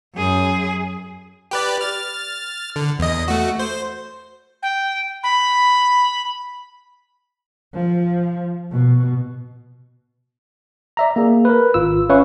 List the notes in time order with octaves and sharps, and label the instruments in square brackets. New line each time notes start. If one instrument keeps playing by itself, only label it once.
[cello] F#2 G#4
[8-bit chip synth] G4 B4 D5
F6 A6
D3
E2 D#5
A3 F#4
C5
[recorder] G5
B5
[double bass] F3
B2
[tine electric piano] D5 E5 A#5
A#3 G#4
A#4 B4
G#1 F4 E6
C#4 B4 C#5 E5 F5 C#6